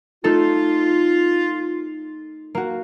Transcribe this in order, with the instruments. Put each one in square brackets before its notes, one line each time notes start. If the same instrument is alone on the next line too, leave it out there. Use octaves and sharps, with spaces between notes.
[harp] A3 D#4 A4 [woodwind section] F4
[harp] A#3 F#4